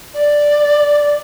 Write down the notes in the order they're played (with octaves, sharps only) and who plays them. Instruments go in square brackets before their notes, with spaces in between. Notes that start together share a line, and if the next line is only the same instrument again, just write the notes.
[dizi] D5